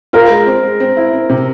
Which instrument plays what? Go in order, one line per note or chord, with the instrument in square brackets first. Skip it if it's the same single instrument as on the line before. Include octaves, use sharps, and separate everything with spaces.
[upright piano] F4 [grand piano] A#4
[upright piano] G#3
C4
G#3
C4
E4
C4
C3